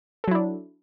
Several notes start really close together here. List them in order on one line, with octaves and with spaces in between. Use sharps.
A4 F#3 E4 D4